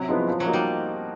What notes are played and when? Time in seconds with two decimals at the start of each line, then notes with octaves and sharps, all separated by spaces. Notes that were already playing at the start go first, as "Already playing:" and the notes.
Already playing: C3 F#3
0.09 F3 G#3 B3 E4
0.28 F3
0.40 F#3
0.46 A#3 D#4 F#4
0.53 G3